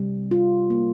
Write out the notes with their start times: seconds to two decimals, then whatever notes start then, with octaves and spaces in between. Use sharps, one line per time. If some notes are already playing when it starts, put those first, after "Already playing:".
Already playing: C3 G3
0.31 F4
0.70 A#3